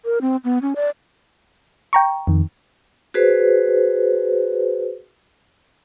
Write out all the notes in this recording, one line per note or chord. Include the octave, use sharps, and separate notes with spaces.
A#4
C4
B3
C#4
D5
G5 A#5 C#6
F2 D#3
F#4 G#4 B4 C5